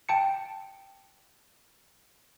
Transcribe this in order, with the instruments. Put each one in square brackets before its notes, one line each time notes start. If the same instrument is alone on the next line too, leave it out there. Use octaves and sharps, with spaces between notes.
[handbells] G5 A5 C#7